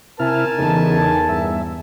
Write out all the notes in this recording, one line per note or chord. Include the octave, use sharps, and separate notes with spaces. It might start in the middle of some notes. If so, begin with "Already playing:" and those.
C3 E4 A#4 G#5 A5 F6
E2 C#3 D#4 A4
G2 E5